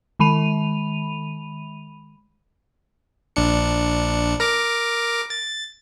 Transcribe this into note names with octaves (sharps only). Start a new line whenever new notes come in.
D#3 G#3 B5 D#7 F7
A#1 D4 C#7
A#4 A#5 D6
A6